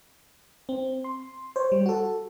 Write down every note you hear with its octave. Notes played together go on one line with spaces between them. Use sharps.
C4
C6
C5 C#5
G3
F#4 A4